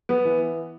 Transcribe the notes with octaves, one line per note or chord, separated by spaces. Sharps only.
B3
E3